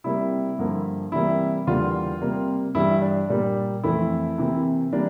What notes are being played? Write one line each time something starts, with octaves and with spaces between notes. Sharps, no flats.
C3 G3 A#3 E4
G2 D3 F3 A#3
C3 E3 G3 A#3 E4
E2 D3 G3 A#3 F4
C3 G3 A#3
G2 E3 G3 E4
D4
A#2 G3 A#3
F2 E3 A3 E4
C3 E3 A#3
E3 G3 A#3 D4